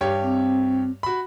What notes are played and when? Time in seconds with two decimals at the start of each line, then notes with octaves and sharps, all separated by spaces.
0.01 G2 G4 C#5
0.22 C4
1.03 F#4 B5